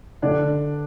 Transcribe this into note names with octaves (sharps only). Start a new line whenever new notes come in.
D3 D4 D5